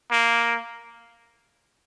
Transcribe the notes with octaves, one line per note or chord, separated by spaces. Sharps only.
A#3